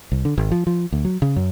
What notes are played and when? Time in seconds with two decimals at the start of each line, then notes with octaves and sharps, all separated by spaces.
0.12 C2
0.25 D3
0.38 G#1
0.52 F3
0.67 F3
0.92 D2
1.05 F#3
1.22 C#3
1.36 F#2